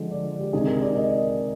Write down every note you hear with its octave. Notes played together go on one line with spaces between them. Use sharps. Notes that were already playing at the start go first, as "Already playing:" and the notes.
Already playing: D3 F3 G#3
D5
G4
C3 D#3 G#3 G#4
A#4
D5
D#5